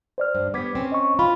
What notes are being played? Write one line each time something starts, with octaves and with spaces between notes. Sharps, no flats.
C5 D5 F6
G2
G3 B3 D6 G#6 B6
C4 C#4
D#5 C#6
F4 B5